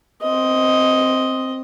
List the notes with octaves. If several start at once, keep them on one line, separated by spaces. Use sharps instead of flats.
C4 D#5